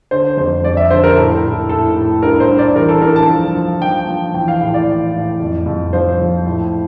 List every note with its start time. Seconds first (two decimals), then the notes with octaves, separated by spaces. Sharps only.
0.11 D3 C5
0.37 F2 C5
0.64 F2 D5
0.77 E5
0.91 D3 C5
1.04 A#4
1.17 A2 A4
1.44 A2
1.69 A2 A4
1.96 A2
2.22 G2 A#4
2.40 C5
2.49 G2
2.59 D5
2.75 E3 A#4
2.89 A4
3.02 G2 A#4
3.16 A5
3.28 F3
3.55 F3
3.81 F3 G5
4.08 F3
4.34 E3 G5
4.48 F5
4.61 A2
4.74 D5
4.87 E3
5.14 A2
5.40 F2
5.66 F2
5.93 F3 C5
6.20 F3
6.46 A2